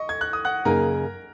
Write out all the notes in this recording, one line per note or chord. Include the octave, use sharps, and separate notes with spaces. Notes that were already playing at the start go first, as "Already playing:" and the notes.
Already playing: D#5 C#6
G#6
F#6
D#6
F#5 F#6
F#2 C#3 A#3 D#4 G#4 A#4 A#5